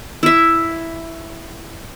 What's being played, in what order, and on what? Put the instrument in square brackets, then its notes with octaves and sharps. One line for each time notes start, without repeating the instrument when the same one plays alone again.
[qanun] E4 E5